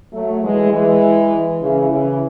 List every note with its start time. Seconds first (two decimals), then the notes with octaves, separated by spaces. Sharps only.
0.13 F#3 A3
0.43 E3 G#3
0.72 E3 G#3
1.61 C#3 E3
1.90 C#3 E3